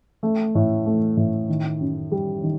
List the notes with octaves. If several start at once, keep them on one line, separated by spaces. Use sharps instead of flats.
A3
A2
A3
A2
D#3
F#2
G3
D#3